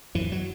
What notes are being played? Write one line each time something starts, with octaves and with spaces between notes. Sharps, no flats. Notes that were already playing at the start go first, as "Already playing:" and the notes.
F#2 E3
F#3